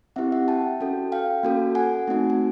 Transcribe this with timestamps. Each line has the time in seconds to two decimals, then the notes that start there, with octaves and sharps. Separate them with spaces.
0.16 C4 E4 G4 E5 F#5
0.32 E5 F#5
0.48 G5 A5
0.81 C#4 F#4 A4
1.12 F5 G5
1.43 A#3 C#4 F#4 A4
1.75 F#5 G#5
2.08 A3 C4 D#4 F#4
2.30 G#5